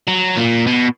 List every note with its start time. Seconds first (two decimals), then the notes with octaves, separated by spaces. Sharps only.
0.08 F#3
0.37 A#2
0.67 B2